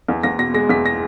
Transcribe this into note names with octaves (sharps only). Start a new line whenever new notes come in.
E2
E2 A#6
B2 A#6
G#3 A#6
E2 B6
A#6